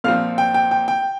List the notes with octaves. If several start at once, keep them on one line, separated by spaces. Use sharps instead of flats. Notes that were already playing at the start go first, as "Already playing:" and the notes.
A#2 F3 C4 F5 F6
G5
G5
G5
G5